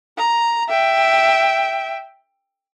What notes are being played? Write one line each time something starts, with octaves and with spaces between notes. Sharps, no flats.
A#5
E5 G5